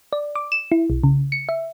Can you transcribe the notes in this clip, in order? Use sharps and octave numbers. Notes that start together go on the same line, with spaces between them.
D5
D6
E7
E4
B1
C#3
C#7
E5